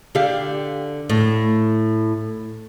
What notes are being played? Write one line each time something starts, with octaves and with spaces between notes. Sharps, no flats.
D3 G4 F5
A2